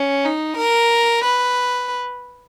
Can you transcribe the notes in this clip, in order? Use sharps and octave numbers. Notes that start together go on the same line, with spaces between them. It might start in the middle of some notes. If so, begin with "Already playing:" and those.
Already playing: C#4
D#4
A#4
B4